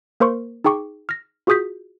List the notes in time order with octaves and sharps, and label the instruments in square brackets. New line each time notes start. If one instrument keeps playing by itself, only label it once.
[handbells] A#3 A#4 C5 C6 C#6
D#4 G#4 G5 C#6 D6
F6 A#6
F4 F#4 G#4 D#6 G6 B6